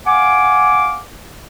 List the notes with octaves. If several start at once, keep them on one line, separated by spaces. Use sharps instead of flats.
F5 F#5 G#5 D6